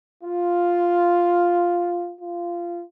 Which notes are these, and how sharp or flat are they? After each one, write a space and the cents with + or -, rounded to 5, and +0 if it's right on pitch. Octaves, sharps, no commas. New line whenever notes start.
F4 +0
F4 -15